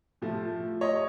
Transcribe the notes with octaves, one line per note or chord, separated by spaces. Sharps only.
A2 F3 A3
C#5 D#5